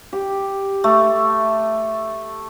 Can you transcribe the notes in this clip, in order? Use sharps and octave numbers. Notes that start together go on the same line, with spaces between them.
G4
A3